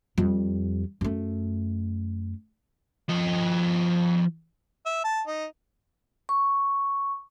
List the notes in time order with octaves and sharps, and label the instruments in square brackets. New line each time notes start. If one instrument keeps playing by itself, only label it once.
[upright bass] F2 G3
F#2 A3
[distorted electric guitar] F3 D#5
[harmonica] E5
A5
D#4
[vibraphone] C#6